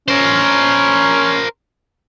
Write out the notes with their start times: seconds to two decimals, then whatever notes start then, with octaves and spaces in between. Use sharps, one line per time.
0.08 C#4 A#4 C5